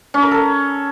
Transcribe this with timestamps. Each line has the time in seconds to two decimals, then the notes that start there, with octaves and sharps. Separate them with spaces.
0.14 C#4
0.23 A#4
0.31 A4